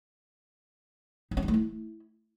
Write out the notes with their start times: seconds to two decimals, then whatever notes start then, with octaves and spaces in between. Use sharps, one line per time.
1.31 D#4
1.37 C#4
1.42 D4
1.48 A3
1.54 E4